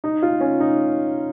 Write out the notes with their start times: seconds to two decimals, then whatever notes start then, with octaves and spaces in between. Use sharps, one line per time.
0.04 D#4
0.22 F4
0.40 C#4
0.60 D#4